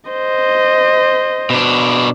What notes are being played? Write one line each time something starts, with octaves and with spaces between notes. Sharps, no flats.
C5 D#5
B2 D4